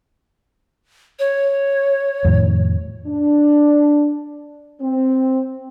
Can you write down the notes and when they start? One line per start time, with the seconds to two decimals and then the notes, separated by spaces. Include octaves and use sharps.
1.19 C#5
2.25 F2 A2 D#3
3.07 D4
4.81 C4